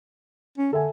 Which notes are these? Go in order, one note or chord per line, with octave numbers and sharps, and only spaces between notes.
C#4
D3 A4 E5 G#5